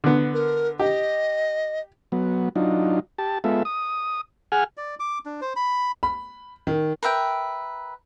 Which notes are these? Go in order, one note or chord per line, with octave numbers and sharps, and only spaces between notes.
D3 B3
A#4
G4 D#5
F#3 B3
F#3 D4 D#4 F4
G4 A5
G#3 B3 F4 A4 E5
D#6
G#4 F#5 G#5 F6
D5
D6
D4
C5
B5
B5
D#3
A#4 B4 E5 G5